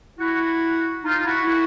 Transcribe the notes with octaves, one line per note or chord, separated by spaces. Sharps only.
E4 F#4
D#4 F4
E4 F#4
E4 F#4